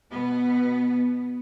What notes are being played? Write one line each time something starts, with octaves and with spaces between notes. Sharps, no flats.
B2 B3